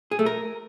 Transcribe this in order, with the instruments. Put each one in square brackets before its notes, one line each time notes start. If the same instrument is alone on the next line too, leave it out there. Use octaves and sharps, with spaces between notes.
[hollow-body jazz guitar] G#4
A3
A#4